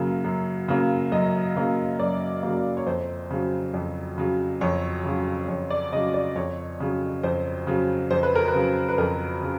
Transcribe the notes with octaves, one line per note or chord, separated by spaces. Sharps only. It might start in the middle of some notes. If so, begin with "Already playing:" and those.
Already playing: F#2 C#3 F#3 A#3
F#2
C#3 F#3 A#3
F#2 D#5
C#3 F#3 A#3
F#2 D5
C#3 F#3 A#3
C#5
F2 C5
C#3 F#3
F2
C#3 F#3
F2 C#5
C#3 F#3
F2 C#5
D5
C#3 F#3 D#5
D5
F2 C#5
C#3 F#3
F2 C5
C#3 F#3
F2 C5
B4
A#4
B4
C#3 F#3
B4
F2 A#4
C#3